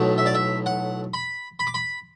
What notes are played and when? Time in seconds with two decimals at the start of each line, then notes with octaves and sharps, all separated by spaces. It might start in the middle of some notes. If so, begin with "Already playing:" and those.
Already playing: B1 A2 F#3 A3
0.18 E5
0.26 D5
0.35 E5
0.66 F#5
1.14 B5
1.59 B5
1.67 D6
1.74 B5